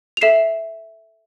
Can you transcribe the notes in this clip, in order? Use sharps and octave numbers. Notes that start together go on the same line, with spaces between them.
F7
A4 E5 C7 E7